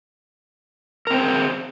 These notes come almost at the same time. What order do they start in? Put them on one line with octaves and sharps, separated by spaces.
A#4 C4 C5 G#4